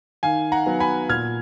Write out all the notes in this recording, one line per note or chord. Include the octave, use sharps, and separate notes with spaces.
D#3 F5 G#5
F#5 A#5
F#3 B3
G#5 B5
A#2 F6 G#6